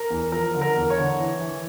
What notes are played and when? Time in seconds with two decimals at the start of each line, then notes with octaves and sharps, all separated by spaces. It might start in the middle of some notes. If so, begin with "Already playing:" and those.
Already playing: A#4
0.10 E2
0.32 F3 A#4
0.55 D3
0.61 A#4
0.76 E2
0.90 C#5
0.98 D3
1.19 E3
1.40 E3